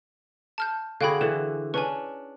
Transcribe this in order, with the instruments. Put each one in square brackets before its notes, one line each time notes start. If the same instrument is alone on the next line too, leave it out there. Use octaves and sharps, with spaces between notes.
[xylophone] A5 F6 G6
[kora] D3 F#4 G#4 [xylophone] F5 G5 B5
[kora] D3 E3 [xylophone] E7
[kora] C#4 D4 [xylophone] B4 G#5